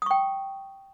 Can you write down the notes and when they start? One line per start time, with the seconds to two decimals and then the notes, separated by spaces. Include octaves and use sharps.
0.02 D#6
0.06 C#6
0.11 G5